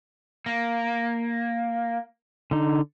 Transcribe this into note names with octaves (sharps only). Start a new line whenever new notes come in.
A#3
D3 D#4